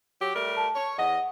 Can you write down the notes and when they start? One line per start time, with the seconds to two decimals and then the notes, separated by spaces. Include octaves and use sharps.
0.21 F#3 G4
0.35 G3 A3 A#4
0.57 A5
0.75 C#5
0.98 E2 D#5 F#5